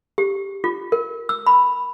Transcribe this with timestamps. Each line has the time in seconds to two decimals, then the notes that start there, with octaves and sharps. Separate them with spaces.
0.18 G4
0.64 F4
0.92 A#4
1.29 E6
1.47 B5